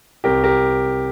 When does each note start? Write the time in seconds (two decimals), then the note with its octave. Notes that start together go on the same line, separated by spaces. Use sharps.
0.24 C2 G4 A#4
0.44 G4 A#4